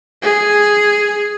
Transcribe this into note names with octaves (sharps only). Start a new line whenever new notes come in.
G#4